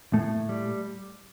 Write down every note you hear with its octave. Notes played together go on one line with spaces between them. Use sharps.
A2 A3
G3